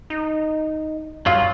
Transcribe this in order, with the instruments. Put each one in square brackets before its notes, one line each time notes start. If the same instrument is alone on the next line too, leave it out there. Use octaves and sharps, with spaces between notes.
[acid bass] D#4
[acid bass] G2 [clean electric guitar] F#3 F4 [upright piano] F5